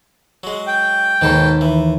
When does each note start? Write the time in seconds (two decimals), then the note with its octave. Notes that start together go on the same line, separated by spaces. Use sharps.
0.43 F#3 G#3
0.67 G5
1.21 D#2 G#2 B2 A4 A#5 B5
1.61 E3